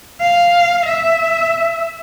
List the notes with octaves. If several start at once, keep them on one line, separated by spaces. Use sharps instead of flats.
F5
E5